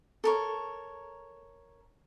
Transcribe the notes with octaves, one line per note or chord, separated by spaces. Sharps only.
A4 A#4 C#5